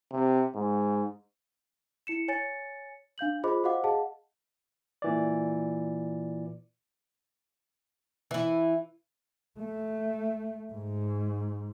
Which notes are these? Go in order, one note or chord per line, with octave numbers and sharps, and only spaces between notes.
C3
G#2
E4 C#7 E7
C#5 G#5 A6 C#7
D4 F5 G6 F#7
F4 G#4 C5 D#5 B5 D6
F#4 C5 D#5 F5 F#5 D6
G#4 D#5 F5 F#5 A5
A#2 E3 D5
E3 E4
A3
G#2